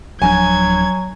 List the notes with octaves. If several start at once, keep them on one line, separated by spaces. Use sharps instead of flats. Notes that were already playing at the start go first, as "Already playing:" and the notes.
D1 F3 F#3 D4 G#5 G#6